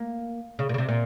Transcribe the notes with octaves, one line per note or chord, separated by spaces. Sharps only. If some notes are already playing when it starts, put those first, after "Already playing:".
Already playing: A#3
C#3
A#2
C#3
C3
A#2